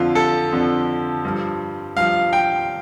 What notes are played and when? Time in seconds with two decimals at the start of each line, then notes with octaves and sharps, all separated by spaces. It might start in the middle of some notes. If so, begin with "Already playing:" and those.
Already playing: F2 D3 F3 F4
0.15 A4
0.52 F2 D3 F3
1.24 G2 F3
1.96 G2 F3 F5
2.33 G5